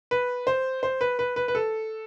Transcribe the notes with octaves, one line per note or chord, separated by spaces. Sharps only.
B4
C5
C5
B4
B4
B4
B4
A4